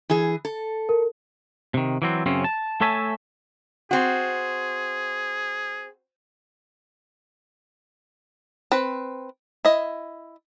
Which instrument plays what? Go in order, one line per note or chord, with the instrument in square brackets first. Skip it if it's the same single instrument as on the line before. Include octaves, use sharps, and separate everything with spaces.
[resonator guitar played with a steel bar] E3 G#4
A4
[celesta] A#4
[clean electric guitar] C3 D#3
E3 F#3 C4
F#2 C#3 C4 C#4
A5
A3 A4 C#5 E5 G#5 A5
[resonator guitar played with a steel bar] C4 F#4 [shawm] G#4
[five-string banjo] C4 B4
E4 D#5